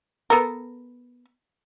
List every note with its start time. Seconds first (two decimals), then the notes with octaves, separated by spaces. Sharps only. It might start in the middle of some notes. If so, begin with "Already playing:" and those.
0.30 B3 A4 A#4